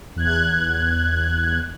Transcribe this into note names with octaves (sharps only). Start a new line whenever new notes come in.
E2 F#6 G#6